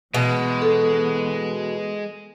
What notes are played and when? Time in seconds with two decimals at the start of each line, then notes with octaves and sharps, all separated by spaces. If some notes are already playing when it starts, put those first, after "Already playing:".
0.14 B2 E3 G#3 B3
0.62 A4